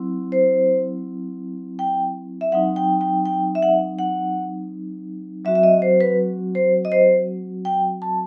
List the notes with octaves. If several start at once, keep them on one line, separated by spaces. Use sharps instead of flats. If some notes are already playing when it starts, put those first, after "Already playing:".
Already playing: F#3 C4 E4
C5
G5
E5
F#3 C4 D#4 F#5
G5
G5
G5
E5
F#5
F#5
F#3 C4 F#4 E5
E5
D#5
C5
B4
C5
D#5
C5
G5
A5